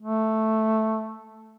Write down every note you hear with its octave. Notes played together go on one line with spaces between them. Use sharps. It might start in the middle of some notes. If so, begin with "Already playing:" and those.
A3